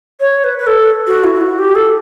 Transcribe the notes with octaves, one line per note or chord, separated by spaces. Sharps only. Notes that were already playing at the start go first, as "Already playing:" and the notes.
C#5
B4
B4
A4
F#4
E4
E4
F#4
G4
A4